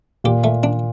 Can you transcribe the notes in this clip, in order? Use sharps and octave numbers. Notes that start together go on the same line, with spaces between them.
A#2 G4
A3
D4